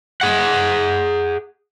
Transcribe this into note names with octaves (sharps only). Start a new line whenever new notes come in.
G#4 F#5